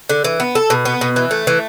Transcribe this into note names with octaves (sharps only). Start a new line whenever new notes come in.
D3
E3
B3
A4
B2
B3
B2
E3
A3
E3